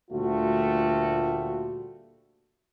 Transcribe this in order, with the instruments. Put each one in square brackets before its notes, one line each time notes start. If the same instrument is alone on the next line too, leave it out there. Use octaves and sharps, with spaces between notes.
[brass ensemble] D2 A#2 G3 A3 F4 F#4